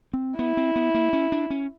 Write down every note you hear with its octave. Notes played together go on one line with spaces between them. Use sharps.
C4
B3 E4
C4
B3
A#3
C#4
D4
C#4